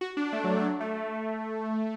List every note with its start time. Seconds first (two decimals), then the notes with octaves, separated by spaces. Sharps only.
0.01 F#4
0.17 D4
0.32 A3
0.44 F#3
0.57 A3
0.64 F#3
0.80 A3